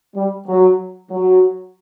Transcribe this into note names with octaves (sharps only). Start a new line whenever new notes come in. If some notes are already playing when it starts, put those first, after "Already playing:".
G3
F#3
F#3